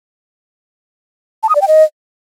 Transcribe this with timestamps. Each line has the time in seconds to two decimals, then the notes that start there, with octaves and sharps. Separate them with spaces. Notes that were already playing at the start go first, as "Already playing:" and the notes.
1.43 A5
1.49 D#6
1.55 D5
1.62 G5
1.68 D#5